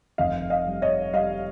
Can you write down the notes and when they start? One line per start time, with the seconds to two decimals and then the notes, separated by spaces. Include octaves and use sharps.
0.18 F1 D#5 F5
0.50 D#5 F5
0.66 G3
0.82 C#5 D#5
1.13 G3 D#5 F5